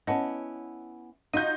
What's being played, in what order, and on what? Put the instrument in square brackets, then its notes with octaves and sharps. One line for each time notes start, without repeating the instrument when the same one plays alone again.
[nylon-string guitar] B3 C#4 E4 [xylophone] D#5 F#5 A5
[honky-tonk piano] D#4 G6 [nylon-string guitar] F4 F#4 [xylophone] D#7